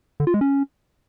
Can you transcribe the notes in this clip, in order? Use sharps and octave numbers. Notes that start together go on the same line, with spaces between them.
D3
F4
G#3
C#4